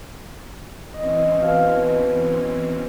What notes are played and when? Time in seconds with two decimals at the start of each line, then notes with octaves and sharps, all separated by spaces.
0.94 E3 C4 C#4 D#5
1.40 B2 F5